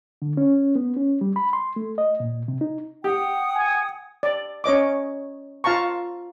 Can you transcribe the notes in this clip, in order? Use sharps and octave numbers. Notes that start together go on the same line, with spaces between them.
D3
C#4
B3
C#4
G3
B5
C6
A3
D#5
A#2
C3
D#4
G4 F#5 G5 D#6
G#5
D5
C#4 C#5 D#5 D6
F4 F5 A5 A#5 C#6